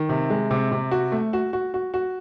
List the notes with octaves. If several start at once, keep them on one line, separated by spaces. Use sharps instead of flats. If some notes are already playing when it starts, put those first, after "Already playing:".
Already playing: D#3
C3
G#3
C3
C3
F#4
A3
F#4
F#4
F#4
F#4